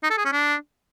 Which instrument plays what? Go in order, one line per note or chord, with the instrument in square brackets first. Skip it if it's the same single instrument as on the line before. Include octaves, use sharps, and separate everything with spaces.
[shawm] D#4
A4
G#4
C#4
D4